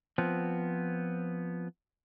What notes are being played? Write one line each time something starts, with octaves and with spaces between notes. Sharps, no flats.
F3 B3 C4